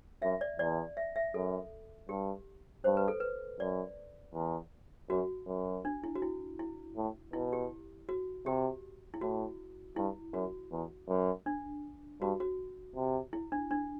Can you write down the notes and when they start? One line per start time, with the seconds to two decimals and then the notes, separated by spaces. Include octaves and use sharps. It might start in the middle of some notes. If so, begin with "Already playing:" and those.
0.22 F#2 E5
0.41 D5
0.59 E2 D5
0.97 E5
1.16 E5
1.34 F#2 A4
2.09 G2 G4
2.84 G2 C5
2.97 B4
3.08 A4
3.20 B4
3.59 F#2 D5
4.34 E2
5.10 F#2 F#4
5.47 F#2
5.85 D4
6.04 E4
6.15 F#4
6.22 E4
6.59 E4
6.96 A2
7.33 B2 E4
7.53 G4
8.09 F#4
8.46 C3 G4
9.14 E4
9.21 A2 F#4
9.96 G2 E4
10.33 F#2 F#4
10.72 E2
11.08 F#2
11.46 D4
12.21 G2 F#4
12.40 F#4
12.96 C3
13.33 E4
13.52 D4
13.71 D4